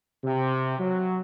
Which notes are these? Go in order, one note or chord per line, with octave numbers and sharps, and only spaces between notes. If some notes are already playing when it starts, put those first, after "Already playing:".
C3
F#3